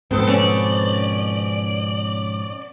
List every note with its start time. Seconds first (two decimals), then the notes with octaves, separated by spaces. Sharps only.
0.11 G#2 B2 F3 B3 C4 A4
0.29 C#4 D5